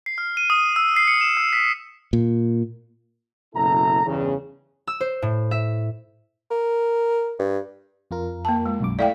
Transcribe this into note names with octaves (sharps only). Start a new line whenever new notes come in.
C7
F6
D#7
D#6
E6
C7
C#7
E7
E6
B6
A#2
F#1 B2 E4 A4 A#5
E2 G2 C#3
E6
C5
A2
E5
A#4
G2
F2 F4 A#4
A#3 A5
G#3
B1 F#2 D6
A3 E4 D5 F5 G5 B6